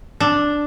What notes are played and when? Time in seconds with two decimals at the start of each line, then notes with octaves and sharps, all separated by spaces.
0.20 D4